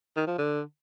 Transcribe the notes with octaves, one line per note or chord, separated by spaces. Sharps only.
D#3
F3
D3